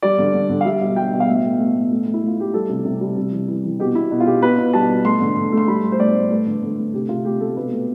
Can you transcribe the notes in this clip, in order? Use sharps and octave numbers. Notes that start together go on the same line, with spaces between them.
G3 D5
D3
D3
D3
F5
G3 E5
B2
G3 G5
B2
F5
A2 E5
A3
A3
A2
A3
A3
E4
A3
F4
A3 G4
G3 A4
C3
C3
G3
C3
E3
E3
E3
B2 G4
B2 E4
B2
F4
B2 G4
B2 B4
B2
G3 A5
B2
A3 C6
D3
D3
A3
C6
G3 B5
A2
C5
A2 D5
A2
A3 B4
D3
D3
A3
C3 G4
C3 F4
A3 G4
A3 A4
B2 B4
A3